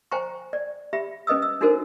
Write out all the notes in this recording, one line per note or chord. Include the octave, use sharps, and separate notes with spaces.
C5 G5 G#5 A#5 C#6
D5
G4 E5 B5
C#4 B4 D#5 D#6 E6
E6
D4 D#4 F#4 A4 A#4 C5